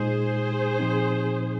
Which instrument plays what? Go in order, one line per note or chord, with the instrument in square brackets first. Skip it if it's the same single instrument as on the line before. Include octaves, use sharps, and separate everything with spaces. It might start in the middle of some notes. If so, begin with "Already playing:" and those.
Already playing: [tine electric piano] A#2 G#3 D#4 [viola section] G#4 C5
[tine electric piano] A#2 F3 C4 D#4